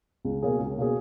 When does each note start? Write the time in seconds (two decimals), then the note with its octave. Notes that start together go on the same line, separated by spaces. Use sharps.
0.25 C#2
0.42 B2 A#3 C#4 G#4
0.59 C#2
0.77 B2 A#3 C#4 G#4